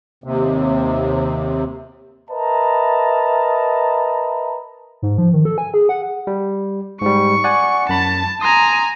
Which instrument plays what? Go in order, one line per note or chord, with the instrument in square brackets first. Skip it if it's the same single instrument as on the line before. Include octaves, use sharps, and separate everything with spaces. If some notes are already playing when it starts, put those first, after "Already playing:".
[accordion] D#2 C3
[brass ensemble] A#4 B4 D#5 E5 A5 A#5
[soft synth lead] G#2
F3
D#3
A4
G#5
G#4
F#5
[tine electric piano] G3
[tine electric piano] G#2 G3 [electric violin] C#6
[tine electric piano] D5 F#5 G#5
[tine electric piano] F#2 B5 [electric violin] A5
[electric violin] G#5 A#5 [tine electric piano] C6 D#6